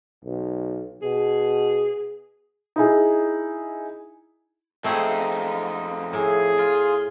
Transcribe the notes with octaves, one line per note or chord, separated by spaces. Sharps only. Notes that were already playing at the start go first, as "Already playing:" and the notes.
B1
B2 G#4
D#4 E4 G#4
F2 A3 C4 D#4 G#4
A2 G#4
F4